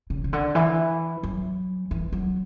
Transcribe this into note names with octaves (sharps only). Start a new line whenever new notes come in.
C#3
C#3
D3
E3
F#3
E3
F#3